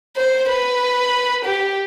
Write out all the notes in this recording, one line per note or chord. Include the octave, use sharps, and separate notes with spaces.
C5
B4
G4